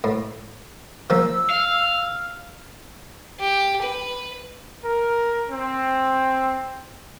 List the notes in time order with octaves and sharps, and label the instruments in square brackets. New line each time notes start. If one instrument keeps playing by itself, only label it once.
[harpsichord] A2
[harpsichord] F3 A#3 C#4 [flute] E6
[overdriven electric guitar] F5
[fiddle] G4
B4
[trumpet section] A#4
C4